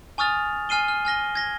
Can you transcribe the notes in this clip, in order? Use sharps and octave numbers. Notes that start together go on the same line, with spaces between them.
G#5 C#6 D#6 F6 A6 F7
G#5 F6 C7 D#7 G7
F6
G#5 F6 A#6 G7
G#6 A#6 G7